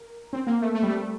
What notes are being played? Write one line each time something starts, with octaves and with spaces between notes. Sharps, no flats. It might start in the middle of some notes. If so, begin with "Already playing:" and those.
Already playing: A#4
C4
A#3
A3
A3
G3
A3